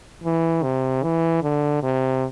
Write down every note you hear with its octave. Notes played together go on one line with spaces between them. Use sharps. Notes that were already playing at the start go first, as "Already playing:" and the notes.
E3
C3
E3
D3
C3